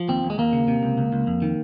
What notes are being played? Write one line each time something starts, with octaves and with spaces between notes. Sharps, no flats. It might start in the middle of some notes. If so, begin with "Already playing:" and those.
Already playing: F3
D#2 C4
D#2
G#3
D#2 A#3
C#3
C3
C#2
C#2
C#2
F2
D#3